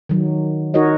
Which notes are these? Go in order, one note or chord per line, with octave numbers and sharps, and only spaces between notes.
D#3 F#3
D#4 F#4 A#4 C#5 D#5